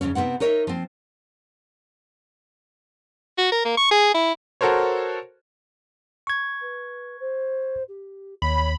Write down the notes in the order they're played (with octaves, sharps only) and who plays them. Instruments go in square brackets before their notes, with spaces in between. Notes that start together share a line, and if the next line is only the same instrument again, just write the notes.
[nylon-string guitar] F2 A#2 C#3 C#4
C3 D#3 B3 C4 F#5
D#4 A#4 C#5 D#5 E5
F3 C4
[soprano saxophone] F#4
A#4
A#3
C#6
G#4
E4
[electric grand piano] F#4 A4 A#4 C5 C#5
[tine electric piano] C#6 G#6
[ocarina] B4
C5
G4
[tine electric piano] D#2 [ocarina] C#5 [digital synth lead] B5